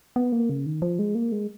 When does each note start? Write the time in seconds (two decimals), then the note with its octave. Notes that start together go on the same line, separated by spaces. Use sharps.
0.16 B3
0.32 A#3
0.50 C#3
0.66 D#3
0.82 F3
0.99 G#3
1.15 A#3
1.32 G#3